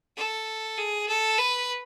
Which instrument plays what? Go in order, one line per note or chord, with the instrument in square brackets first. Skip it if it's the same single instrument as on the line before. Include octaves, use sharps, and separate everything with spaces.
[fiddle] A4
G#4
A4
B4